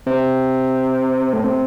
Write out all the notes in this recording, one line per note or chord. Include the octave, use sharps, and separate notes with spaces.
C3
A2
C3